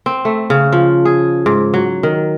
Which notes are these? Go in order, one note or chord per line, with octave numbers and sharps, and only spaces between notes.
C4
A3
C#3
F3
G#4
G#2
F#3
D#3